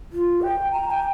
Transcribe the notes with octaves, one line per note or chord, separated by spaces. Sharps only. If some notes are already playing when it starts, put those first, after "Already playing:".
F4
G5
A#5
G5